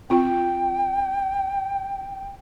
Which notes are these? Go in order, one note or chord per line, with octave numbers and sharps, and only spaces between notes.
C4 F4 G5